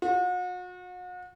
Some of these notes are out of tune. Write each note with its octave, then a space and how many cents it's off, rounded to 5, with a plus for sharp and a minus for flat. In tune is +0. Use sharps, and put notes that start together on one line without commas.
F#4 -40